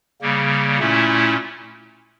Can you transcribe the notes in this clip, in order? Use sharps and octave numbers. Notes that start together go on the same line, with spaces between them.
C#3 G3 A#3
A#2 A3 C#4 E4